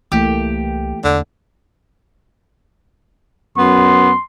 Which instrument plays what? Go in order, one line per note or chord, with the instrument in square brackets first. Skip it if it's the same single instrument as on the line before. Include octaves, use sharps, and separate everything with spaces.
[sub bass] C2 [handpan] E3 A3 A#3 [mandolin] G4
[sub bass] E2 [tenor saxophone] D3
[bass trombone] F#2 [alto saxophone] B3 [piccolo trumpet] C6